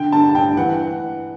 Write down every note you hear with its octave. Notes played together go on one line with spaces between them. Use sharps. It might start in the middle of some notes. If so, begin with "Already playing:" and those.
Already playing: D3 G5
G2 A5
G2 G5
E3 F#5